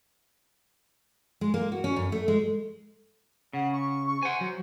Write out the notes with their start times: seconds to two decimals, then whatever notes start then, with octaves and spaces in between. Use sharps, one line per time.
1.41 G#3
1.54 A#3
1.72 F#4
1.84 C#4
1.96 F#2
2.12 A3
2.28 G#3
3.53 C#3 F#5
3.73 C#6
4.07 C#6
4.23 C5 F#5 G#5
4.41 F#3